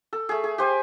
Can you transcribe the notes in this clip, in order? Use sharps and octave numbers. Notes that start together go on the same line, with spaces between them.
A4
A3 G#4
G#4
G4 C5 G#5